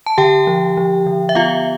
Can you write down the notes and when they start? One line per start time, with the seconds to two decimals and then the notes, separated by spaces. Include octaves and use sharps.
0.06 A5
0.18 D3 G4 G5
0.47 F3
0.77 F3
1.06 D3
1.29 E5
1.35 B3 F4 F5